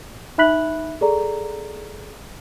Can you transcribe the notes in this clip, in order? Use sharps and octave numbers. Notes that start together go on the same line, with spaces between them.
D#4 E5 B5 F#6 B6 F#7
G#4 A4 D5 A#5